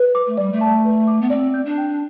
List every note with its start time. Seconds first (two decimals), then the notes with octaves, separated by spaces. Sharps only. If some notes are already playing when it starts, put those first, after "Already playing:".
Already playing: B4
0.15 D6
0.27 A3
0.37 G3 D5
0.53 A3
0.61 A5
0.85 B4
1.08 D6
1.22 B3
1.30 C4 D5
1.54 G6
1.66 D4
1.78 G5